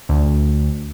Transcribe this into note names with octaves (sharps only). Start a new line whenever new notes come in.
D2